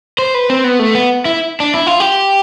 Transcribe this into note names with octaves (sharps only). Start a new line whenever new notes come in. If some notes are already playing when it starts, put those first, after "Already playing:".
C5
B4
C4
B3
A3
B3
E4
D4
E4
F4
G4